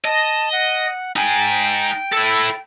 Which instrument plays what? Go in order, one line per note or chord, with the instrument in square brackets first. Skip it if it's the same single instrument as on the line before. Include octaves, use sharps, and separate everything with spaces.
[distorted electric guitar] D#5 [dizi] A5
[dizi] F#5
[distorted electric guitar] D#4 G#5 [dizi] G5
[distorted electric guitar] E4 A4